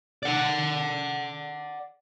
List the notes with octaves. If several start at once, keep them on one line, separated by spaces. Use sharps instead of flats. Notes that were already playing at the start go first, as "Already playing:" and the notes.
D5 F#5